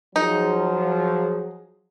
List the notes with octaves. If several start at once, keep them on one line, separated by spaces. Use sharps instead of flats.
F3 F#3 D#4 G#4